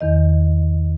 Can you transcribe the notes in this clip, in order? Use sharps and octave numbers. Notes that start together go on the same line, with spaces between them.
E2 D#3 D#5